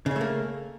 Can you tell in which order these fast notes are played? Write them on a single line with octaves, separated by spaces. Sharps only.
C#3 C#4 A3 A#3